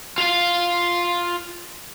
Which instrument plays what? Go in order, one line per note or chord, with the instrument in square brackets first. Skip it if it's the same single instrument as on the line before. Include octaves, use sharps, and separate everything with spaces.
[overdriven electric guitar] F4 F5